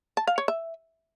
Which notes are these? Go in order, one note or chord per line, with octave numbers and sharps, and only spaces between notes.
A5
F5
C#5
E5